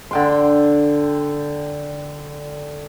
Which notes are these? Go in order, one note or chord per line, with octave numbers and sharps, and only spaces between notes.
D3 G5 C6